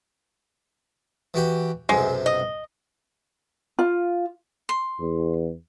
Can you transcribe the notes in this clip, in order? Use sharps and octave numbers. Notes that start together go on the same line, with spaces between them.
E3 F#4 G4
B1 F#2 C3 G#3
D#5
F4
C6
E2